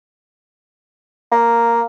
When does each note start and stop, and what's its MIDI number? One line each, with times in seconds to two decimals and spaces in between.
1.32 1.83 58